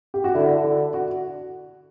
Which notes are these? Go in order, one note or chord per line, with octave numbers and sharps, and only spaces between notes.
G4
F#4
D3 E4
D3
F#4